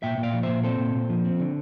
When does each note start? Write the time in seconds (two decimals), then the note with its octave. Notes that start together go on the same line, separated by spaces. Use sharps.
0.03 A#2 E5 G5
0.18 A#2
0.23 D5 F5
0.34 F3
0.43 A#2 C5 E5
0.63 C4 A4 C5
0.79 A#2
0.95 A#2
1.09 F3
1.25 C4
1.40 D3